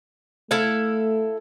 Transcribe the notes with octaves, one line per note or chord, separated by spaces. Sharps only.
A3 E4 A4 F5